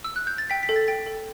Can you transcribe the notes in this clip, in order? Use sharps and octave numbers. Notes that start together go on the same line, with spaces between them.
E6
F#6
G6
A6
G5 B6
B6
A4
A6
G5 A6
A4